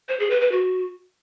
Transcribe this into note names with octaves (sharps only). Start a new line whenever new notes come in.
C5
G#4
B4
B4
F#4